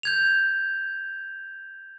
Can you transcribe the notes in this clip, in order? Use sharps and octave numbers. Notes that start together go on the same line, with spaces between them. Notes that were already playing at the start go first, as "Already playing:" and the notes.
G6 G#6 F7